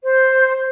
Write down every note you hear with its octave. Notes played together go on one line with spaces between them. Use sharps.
C5